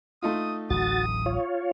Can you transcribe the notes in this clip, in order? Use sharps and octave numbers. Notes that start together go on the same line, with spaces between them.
A3 D#4 F4 D#6
D1 A1 F#3 F#4 D#6 A6
F4 C#5